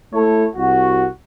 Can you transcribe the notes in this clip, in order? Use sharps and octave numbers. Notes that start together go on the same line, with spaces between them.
A3 E4 A4 C#5
C2 F#4